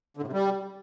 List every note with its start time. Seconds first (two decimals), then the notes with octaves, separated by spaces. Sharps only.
0.17 D3
0.22 A2
0.28 C3
0.33 G3